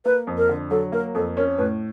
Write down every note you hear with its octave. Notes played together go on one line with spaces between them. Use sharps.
A#3 B4
F2
A#4
D3
F#3 A4
A#3 A#4
F2 A4
C#4 A#4
A2 B4